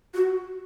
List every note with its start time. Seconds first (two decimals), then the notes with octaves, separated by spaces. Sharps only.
0.14 F#4